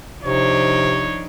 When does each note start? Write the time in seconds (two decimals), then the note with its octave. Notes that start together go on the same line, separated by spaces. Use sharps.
0.24 C3 F3 D4 D#4 C5 C#5